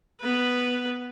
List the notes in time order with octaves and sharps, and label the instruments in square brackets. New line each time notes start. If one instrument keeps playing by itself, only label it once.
[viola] B3 B4